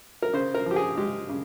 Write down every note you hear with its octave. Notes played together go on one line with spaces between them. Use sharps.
A#4
C#3 C5
A#4
F3 G4
G#4
G#3 G4
C#3